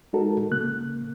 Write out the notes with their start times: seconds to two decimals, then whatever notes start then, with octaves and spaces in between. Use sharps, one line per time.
0.13 G#3 D#4 F#4 A4 A#4
0.51 C#3 A#3 F#6